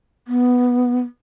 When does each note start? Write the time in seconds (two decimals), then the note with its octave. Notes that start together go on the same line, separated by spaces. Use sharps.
0.28 B3